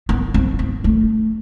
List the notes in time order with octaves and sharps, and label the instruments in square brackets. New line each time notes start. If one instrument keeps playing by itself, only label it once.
[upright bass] B3
C4
B3
A3